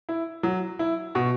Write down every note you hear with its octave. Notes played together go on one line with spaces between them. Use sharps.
E4
F#3
E4
B2 F#4